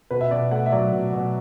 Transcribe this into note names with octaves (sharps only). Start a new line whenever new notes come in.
B2 B4
E5
B2 D5
A3 F#5
E5
F#3 D5
B2
B2